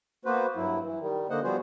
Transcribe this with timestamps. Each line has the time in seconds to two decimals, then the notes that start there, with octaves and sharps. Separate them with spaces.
0.25 A#3 B3 F#4 B4 C5
0.56 G2 F#3 E4
0.83 E3
1.00 D#3 G3
1.30 D3 A#3 C5 D#5 F#5
1.43 F3 G3 B3 F#4 G#4 C5